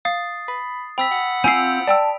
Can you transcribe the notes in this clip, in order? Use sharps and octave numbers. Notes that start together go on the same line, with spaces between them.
F5 D#6 A6 C7
B5
C4 G5 B5 E6 B6
F#5
C4 F4 G#5 E6 C7 D7 F7
D5 G5 A5 E6